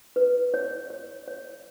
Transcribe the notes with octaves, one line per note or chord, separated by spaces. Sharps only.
B4
C#5
C#5
C#5